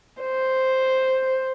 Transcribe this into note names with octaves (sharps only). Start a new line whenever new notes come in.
C5